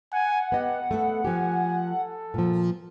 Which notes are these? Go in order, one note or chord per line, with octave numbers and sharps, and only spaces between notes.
F#5 G#5
B3 G4 D#5
A3 B3 A4
F3 G4 G#5
A4
A#2 F3